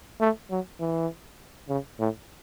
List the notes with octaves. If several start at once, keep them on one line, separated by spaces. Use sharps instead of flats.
A3
F#3
E3
C#3
A2